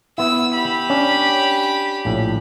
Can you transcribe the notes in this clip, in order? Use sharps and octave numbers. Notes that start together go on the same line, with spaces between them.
B3 E4 E6
G4 B5
C#4 D4
A#1 A2